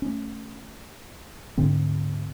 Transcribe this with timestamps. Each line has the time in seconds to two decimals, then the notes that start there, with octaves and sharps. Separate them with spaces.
0.02 A3 C#4
1.57 D2 G#2 D3 C4